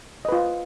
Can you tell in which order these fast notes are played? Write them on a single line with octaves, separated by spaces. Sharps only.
D#5 B4 F4